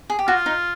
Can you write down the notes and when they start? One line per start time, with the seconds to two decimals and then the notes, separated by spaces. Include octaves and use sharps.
0.10 G#4
0.19 G4
0.27 F4 F#4
0.46 D#4